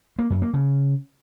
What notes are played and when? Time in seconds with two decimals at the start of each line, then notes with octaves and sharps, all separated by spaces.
0.19 A#3
0.30 F#2
0.42 A#3
0.54 C#3